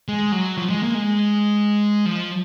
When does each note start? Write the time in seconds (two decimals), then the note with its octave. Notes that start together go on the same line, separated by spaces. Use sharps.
0.08 G#3
0.32 F#3
0.57 F3
0.70 G#3
0.82 A#3
0.95 G#3
2.06 F3